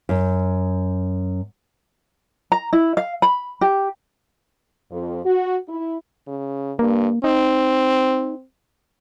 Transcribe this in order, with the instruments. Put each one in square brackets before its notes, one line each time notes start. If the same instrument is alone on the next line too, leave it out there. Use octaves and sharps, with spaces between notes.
[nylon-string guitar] F#2
[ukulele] A#5
E4
F5
B5
G4
[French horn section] F2
F#4
E4
[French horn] C#3
[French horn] G2 [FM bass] A#3
[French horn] C4 [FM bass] D#4